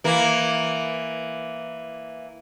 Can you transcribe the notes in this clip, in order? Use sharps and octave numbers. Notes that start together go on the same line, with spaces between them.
E3 A#3